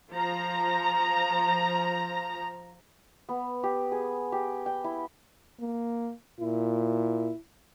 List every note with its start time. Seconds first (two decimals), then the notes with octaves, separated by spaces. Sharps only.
0.11 F3 A#5
3.29 B3
3.63 G4
3.92 G#4
4.32 G4
4.66 G5
4.84 E4
5.60 A#3
6.40 A#2 E4